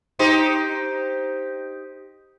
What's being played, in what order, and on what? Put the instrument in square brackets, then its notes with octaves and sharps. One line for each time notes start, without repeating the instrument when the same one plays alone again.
[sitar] D#4 G4 C5